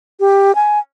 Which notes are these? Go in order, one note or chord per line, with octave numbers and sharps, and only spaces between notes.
G4
G#5